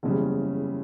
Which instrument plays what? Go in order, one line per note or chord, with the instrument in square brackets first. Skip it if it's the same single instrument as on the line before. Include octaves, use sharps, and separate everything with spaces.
[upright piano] F#1 E2 C#3 E3 G3